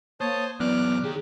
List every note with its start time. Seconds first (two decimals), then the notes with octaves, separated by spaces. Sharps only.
0.21 A#3 C5 C#5 A5 D#6
0.60 F#2 E3 B3 D5 D6 F6 F#6
1.04 D#3 G4 G#4